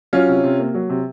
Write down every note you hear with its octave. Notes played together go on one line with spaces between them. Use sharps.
F#3 C#4 F4
C3
C3
A#3
F#3
C3